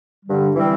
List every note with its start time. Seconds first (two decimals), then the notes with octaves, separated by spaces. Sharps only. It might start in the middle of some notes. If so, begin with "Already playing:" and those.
0.25 G2 D3 G3
0.56 E3 G3 C4